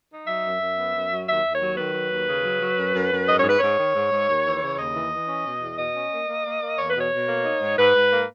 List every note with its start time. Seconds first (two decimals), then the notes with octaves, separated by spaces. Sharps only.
0.10 D#4
0.27 F#3 E5
0.43 F#2
0.60 F#2
0.77 B3
0.93 F#2
1.10 F#3
1.27 D#2 E5
1.44 D#2
1.52 C#5
1.61 F#3
1.77 D#3 B4
1.93 F#3
2.10 D#2
2.27 C#3
2.43 F#3
2.61 F#3
2.77 F#2
2.93 F#2
3.10 F#2
3.27 G#2 D#5
3.37 C#5
3.44 G#2 B4
3.58 G#2 C#5
3.77 D#3
3.93 G#2
4.10 G#2
4.27 D#2
4.44 E3
4.60 C#3
4.77 D#2 D#5
4.94 E3
5.10 E3
5.27 C#4
5.44 B2
5.61 E2
5.77 B2 D#5
5.94 C#4
6.10 A#3
6.27 A#3
6.44 A#3
6.60 A#3
6.77 E2 C#5
6.89 B2 B4
7.00 C#5
7.10 B2
7.27 A#3
7.44 D#4
7.61 G#2
7.77 G#2 B4
7.94 G#2
8.11 A#3